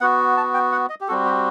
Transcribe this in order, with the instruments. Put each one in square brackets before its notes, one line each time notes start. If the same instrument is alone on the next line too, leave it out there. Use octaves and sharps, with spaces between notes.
[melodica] B3 F#4 F#5
A5
G5
F#5
D#5
G4
G3 C4 F#4 A4
G4